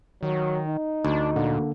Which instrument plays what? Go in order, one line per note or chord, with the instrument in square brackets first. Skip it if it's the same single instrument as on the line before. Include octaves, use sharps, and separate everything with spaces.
[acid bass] D#3 [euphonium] F#3
[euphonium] D#4
[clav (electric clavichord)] D2 [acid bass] D4
[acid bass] A#2 [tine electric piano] D3 A#3